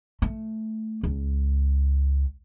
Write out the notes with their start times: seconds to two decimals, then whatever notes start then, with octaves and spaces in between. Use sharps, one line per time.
0.22 A3
1.03 C#2